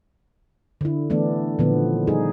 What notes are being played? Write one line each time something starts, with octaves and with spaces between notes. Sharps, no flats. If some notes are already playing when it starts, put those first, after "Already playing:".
D3 E4
E3 A3 B3 D4
A#2 D3 D#3 F3 B3
G3 D#4 G#4